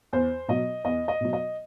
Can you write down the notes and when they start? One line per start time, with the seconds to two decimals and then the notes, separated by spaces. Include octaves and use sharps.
0.13 E2 C5
0.48 B2 F#3 D#5
0.84 E2 D#5
1.08 D#5
1.21 B2 F#3
1.33 D#5